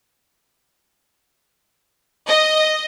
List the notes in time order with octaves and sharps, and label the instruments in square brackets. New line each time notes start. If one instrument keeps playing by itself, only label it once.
[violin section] D#5